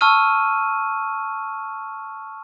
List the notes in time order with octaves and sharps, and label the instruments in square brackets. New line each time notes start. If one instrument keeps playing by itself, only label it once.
[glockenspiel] A5 C#6 E6 F6 D#7